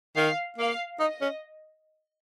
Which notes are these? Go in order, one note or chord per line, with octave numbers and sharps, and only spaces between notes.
D#3 F5
A#3 F5
D#4 D#5
C#4